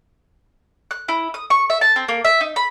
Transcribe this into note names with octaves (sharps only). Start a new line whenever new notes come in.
F#6
E4
D#6
C#6
E5
A5
C4
A#3
E5
D#4
B5